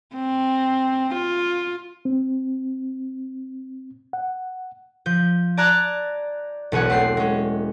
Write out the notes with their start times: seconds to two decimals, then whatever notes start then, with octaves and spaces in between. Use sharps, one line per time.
0.15 C4
1.14 F4
2.05 C4
4.13 F#5
5.06 F3 G6
5.57 D5 A5 A#5 F#6 G#6
6.72 E1 B1 G#4 C#5 F#5
6.90 A3 C4 C7
7.17 G#3 C#4